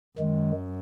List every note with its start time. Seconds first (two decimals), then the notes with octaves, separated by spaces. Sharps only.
0.18 F#2 D#3 G#3